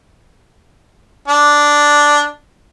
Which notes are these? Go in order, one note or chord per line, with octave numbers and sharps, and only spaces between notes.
D4